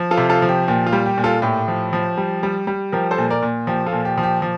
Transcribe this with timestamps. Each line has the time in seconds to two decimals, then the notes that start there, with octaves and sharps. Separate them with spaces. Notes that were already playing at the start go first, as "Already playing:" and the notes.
Already playing: F3
0.11 F4 A4
0.18 C3
0.30 F4 A4
0.42 F3
0.49 G4
0.68 A#2 G4
0.87 F4
0.92 G3
1.06 G4
1.18 A#2
1.24 F4 A4
1.42 A2 G4
1.68 F3
1.93 F3
2.17 G3
2.43 G3
2.67 G3
2.92 F3 G4 A#4
3.11 A4 C5
3.18 A#2
3.30 A#4 D5
3.42 A#2
3.67 F3 G4
3.86 F4 A4
3.92 A#2
4.05 G4
4.18 F3
4.23 G4
4.42 F3